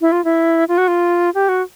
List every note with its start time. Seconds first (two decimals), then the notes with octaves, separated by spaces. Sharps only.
0.01 E4
0.12 F4
0.25 E4
0.68 F4
0.78 F#4
0.88 F4
1.35 G4
1.49 F#4